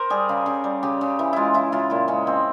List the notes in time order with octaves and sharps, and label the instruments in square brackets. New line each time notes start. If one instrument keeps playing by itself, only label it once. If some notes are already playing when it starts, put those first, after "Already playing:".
Already playing: [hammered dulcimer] A#4 C5
G3 G#4
C#3
C#3
G3
C#3 G4
C#3
E3
G#3 E4 F4
C#3 E4
C#3 F4
A#2 E4
G#3 C#4
G#3 C4